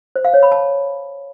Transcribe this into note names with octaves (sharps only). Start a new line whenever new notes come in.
C5
F5
C#5
B5
A5